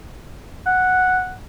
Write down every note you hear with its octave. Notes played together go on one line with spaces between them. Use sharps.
F#5